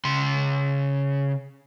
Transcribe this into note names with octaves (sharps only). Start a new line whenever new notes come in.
C#3 C6